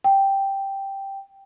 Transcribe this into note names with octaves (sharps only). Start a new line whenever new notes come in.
G5